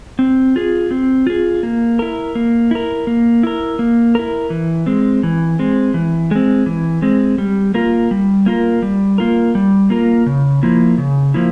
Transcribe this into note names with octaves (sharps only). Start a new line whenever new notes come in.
C4
F4 G#4
C4
F4 G#4
A#3
E4 A#4
A#3
E4 A#4
A#3
E4 A#4
A#3
E4 A#4
E3
G#3 C4
E3
G#3 C4
E3
G#3 C4
E3
G#3 C4
G3
A#3 F4 A#4
G3
A#3 F4 A#4
G3
A#3 F4 A#4
G3
A#3 F4 A#4
C#3
F3 A#3 E4
C#3
F3 A#3 E4